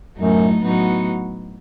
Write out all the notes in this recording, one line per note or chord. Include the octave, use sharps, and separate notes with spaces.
F#2 A2 F#3 A3 D#4
A2 F#3 B3 D#4 F#4